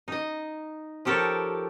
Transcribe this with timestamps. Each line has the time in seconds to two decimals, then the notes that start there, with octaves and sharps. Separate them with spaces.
0.08 D#4 D#5
1.05 F3 G4 A4 A#4 C#5